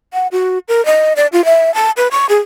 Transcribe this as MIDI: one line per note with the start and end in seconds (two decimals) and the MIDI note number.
0.14 0.27 78
0.32 0.59 66
0.68 0.84 70
0.86 1.13 75
1.16 1.27 74
1.33 1.44 65
1.45 1.74 76
1.74 1.91 81
1.97 2.08 71
2.11 2.26 85
2.29 2.39 68